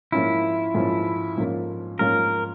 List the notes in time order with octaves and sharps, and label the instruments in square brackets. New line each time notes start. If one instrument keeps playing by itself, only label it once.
[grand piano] G#2 F3 A#3 C#4 F4 [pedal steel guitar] E4
[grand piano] G#2 F3 A#3 C#4 F4
G#2 F3 A#3 C#4 F4
[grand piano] G#2 F3 A#3 C#4 F4 [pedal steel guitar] A#4